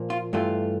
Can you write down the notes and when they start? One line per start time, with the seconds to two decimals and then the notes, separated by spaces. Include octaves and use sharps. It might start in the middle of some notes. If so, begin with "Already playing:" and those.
Already playing: A#2 F3 A#3
0.10 F4
0.33 G2 E3 A3 F4